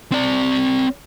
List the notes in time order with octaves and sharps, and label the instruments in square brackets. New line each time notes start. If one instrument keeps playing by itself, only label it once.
[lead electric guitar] C4 D5